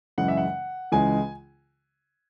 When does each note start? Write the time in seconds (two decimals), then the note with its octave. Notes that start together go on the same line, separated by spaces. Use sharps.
0.18 F#2 C#3 E3 G#3 F#5
0.28 E5
0.37 F#5
0.92 C#2 C#3 E3 G#3 G#5